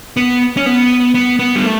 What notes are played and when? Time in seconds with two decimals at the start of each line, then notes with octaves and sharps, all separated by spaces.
0.17 B3
0.57 C#4
0.66 B3
1.15 B3
1.39 B3
1.55 G3
1.63 A3